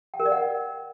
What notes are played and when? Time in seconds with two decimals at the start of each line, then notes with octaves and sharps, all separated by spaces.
0.14 G5
0.20 A#4
0.26 D5
0.32 F#5